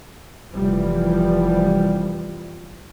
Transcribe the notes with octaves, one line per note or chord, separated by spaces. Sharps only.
F1 E3 F3 G3